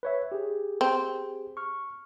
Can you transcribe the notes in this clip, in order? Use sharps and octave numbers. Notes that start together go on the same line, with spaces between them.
B4 C#5 E5
G4 G#4
C4
C#6 F6